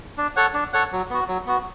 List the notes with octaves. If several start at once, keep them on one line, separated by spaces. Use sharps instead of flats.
D4
A4 C#5 F#5
D4
A4 C#5 F#5
F#3
B3 F#4
F#3
B3 F#4